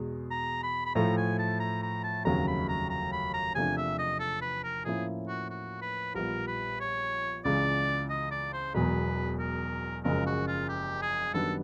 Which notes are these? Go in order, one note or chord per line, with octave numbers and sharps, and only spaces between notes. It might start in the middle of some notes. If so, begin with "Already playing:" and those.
Already playing: E2 B2 G#3
A#5
B5
B5
A2 F3 A3 A#5
G#5
A5
A#5
A#5
A5
F1 D#2 C#3 F#3 A#5
B5
A#5
A#5
B5
A#5
E2 C3 F3 A3 D4 G#5
E5
D#5
A4
B4
A#4
A2 F3 A#3 C#4 E4 G#4
F#4
F#4
B4
A#1 A#2 G3 B3 A#4
B4
C#5
C#2 C#3 E3 D5
D#5
D5
C5
E1 E2 B2 F#3 B4
A#4
F#1 F#2 C#3 F3 G#3 A#4
F#4
F4
G4
G#4
F#2 D#3 G3 B3 D4 A4